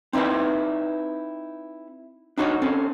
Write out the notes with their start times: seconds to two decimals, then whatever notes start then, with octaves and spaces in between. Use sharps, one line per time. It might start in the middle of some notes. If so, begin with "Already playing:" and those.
0.13 C4 D#4 E4 B4 D5
2.38 D4 D#4 F#4 C5 C#5
2.62 C4 C#4 A4